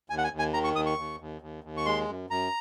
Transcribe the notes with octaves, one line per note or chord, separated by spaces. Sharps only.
D#2 G#5
F#5
G#5
D#2
G#5
D#3 A#5
C#6
D#2 D#6
C#6
D#2
D#2
D#2
D#2
C#6
G#3 C6
F#2
F#2 A#5